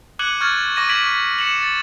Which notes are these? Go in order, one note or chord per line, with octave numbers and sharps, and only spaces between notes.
D6 F#6 G#6 C#7 D#7 F#7
C#6 F6 G#6 A6
C#6 D6 A#6 D#7
D6 G#6 B6 D7 F#7
A#6 C#7 E7 F#7
A6